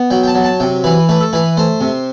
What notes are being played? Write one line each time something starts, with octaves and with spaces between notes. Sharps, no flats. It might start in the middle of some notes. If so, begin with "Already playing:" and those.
Already playing: B3
F#3 G5
G5
A5
F#3
A5
C3 G5
E3 B4
A3 B4
A4
E3 B4
A3 C5
C3